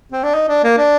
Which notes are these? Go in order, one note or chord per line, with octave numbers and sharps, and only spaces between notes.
C4
D4
D#4
D4
A#3
D4